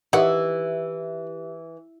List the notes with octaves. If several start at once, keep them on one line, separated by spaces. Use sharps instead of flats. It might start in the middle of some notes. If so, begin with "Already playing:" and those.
D#3 E3 G4 D#5 E5 F#5